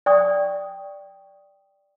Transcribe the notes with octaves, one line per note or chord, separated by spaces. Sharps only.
D5 G5 C#6 D#6